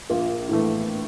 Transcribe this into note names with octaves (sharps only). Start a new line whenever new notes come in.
A#1 F4
A2 E3 A3